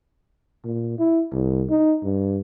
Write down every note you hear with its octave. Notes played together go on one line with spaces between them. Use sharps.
A#2
E4
C2
D#4
G2